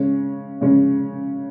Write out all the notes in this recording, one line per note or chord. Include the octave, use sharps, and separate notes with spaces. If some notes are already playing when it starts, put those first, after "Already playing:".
Already playing: C#3 G#3 C#4
C#3 G#3 C#4